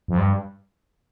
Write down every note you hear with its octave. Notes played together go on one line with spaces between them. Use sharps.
F2
G2